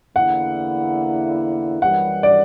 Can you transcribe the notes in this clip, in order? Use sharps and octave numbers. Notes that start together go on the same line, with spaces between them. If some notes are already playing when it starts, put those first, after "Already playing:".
E2 D3 A#3 E4 F#5
F#2 E3 G3 F#5
D5